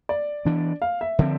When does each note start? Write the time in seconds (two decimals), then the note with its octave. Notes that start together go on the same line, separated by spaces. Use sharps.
0.09 D5
0.45 E3 B3 D4
0.82 F5
1.01 E5
1.19 D3 F3 C4